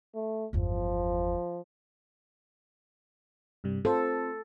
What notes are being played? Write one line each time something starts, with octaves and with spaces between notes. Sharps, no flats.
A3
G1 E2 F3
G2 C3 G3
C4 F4 A4 C5